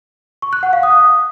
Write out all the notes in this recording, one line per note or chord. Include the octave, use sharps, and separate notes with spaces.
C#6
F#6
F#5
F5
D#6